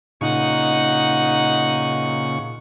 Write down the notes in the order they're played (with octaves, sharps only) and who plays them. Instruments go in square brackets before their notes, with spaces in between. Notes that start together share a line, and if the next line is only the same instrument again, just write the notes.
[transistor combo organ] A#2 C#3 C#6 [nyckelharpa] D#4 F#5